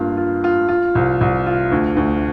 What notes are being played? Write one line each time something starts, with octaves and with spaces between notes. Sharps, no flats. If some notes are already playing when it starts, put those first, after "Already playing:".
Already playing: G2 A#3 F4
F4
F4
F4
C2
C2
F4
D2
D2